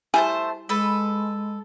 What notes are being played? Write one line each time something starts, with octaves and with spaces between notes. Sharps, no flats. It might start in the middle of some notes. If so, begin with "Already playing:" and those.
G3 A3 E4 C5 G#5 A5
G#3 A4 B4